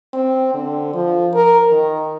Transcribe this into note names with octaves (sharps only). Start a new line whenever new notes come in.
C4
D3
F3
A#4
D#3